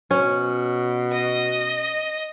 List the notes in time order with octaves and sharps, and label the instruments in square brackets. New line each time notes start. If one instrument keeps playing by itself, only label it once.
[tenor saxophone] B2 [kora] C#4
[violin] D#5